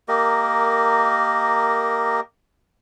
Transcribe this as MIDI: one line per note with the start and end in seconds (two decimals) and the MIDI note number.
0.08 2.20 58
0.08 2.20 67
0.08 2.20 70
0.08 2.20 75